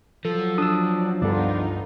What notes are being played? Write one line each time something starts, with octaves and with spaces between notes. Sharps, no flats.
F3 F#3 A4
D4 D#6 E6
C#2 G2 B3 D4 D#4 F4 A4